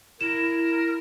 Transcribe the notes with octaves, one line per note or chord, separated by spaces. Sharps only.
E4 A#4 E7